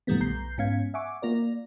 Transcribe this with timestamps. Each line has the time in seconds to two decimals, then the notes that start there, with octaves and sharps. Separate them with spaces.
0.07 F#2 A#2 D#3 G3 A3 B3
0.20 B1 A#5 G6 C7
0.58 G#2 B3 C#4 F5 G#6
0.94 E5 F#5 G#5 C#6 D6
1.22 A#3 F4 A#4 D5